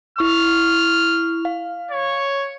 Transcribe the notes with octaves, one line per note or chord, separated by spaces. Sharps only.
E4 C#6 F6
F5
C#5